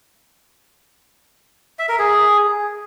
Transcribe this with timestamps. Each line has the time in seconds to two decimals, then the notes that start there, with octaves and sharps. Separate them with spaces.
1.79 E5
1.89 A#4
1.99 G#4